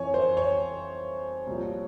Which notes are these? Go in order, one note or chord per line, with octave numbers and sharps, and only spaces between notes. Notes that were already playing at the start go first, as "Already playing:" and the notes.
Already playing: F2 E3 C#5 G#5
C5
C#5
C2 A#2 F3